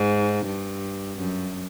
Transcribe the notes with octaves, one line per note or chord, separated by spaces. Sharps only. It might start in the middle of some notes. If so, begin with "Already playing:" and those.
Already playing: G#2
G2
F#2